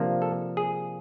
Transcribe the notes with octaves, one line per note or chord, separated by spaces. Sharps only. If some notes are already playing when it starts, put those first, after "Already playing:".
Already playing: C3 F3 A#3 D4
A4
G#4